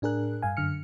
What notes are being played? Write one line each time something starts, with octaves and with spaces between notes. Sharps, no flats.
A2 D4 G#4 A#4 F#6
G2 F5 G#5
F#2 D3 F6 C#7